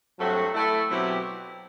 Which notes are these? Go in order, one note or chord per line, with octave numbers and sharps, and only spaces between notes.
G2 F#3 A3 C4 F#4
A3 E4 A4
B2 F#3 C4 E4 G4